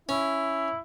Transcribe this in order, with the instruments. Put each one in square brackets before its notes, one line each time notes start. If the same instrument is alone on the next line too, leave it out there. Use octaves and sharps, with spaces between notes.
[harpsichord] C#4 [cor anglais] E4